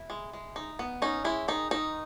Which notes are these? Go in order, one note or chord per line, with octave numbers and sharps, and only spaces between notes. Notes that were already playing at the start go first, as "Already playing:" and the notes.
Already playing: E4
G#3
G#3
D#4
B3
C#4 D#4
G#3 E4
D#3 D#4
D#3 D#4